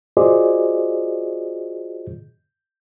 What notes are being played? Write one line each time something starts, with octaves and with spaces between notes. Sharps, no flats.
F4 F#4 G#4 C5 D5 D#5